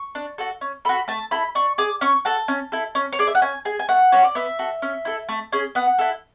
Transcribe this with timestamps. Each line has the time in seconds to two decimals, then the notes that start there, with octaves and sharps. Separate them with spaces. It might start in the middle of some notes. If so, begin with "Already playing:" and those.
Already playing: C#6
0.15 D4
0.38 F#4 A4
0.61 C#4
0.85 F#4 A4 B5
1.08 A3 A5
1.31 E4 A4 B5
1.55 D4 C#6
1.78 G#4 D6
2.01 C#4 C#6
2.25 F#4 A4 A5
2.48 C#4
2.72 E4 A4
2.95 C#4
3.13 C#5
3.19 G#4 D5
3.27 E5
3.35 F#5
3.42 C#4 G#5
3.65 G#4 G#5
3.79 G#5
3.88 A3 F#5
4.12 C#4 F#4 C#5
4.24 D5
4.35 B3 E5
4.59 F#4 A4
4.82 C#4
5.05 E4 A4
5.29 A3
5.52 C#4 G#4
5.75 B3 F#5
5.99 E4 A4